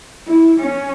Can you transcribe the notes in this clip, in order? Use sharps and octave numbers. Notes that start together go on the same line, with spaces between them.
E4
C#4